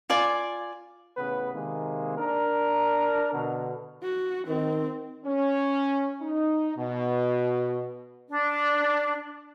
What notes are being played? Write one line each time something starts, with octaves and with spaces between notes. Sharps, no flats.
F4 D5 G#5
A1 C#3 B3 B4
C3 D#3 G#3 A#3
D4 A#4
B2 D3
F#4
D#3 C4
C#4
D#4
B2
D4